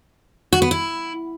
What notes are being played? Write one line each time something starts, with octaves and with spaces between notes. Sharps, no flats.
F#4
B3
E4